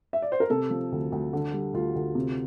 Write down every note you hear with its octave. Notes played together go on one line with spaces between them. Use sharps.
E5
D5
C5
A#4
C3 A4
F3
D2
D2
D3
G3
D2 F4
D2
C3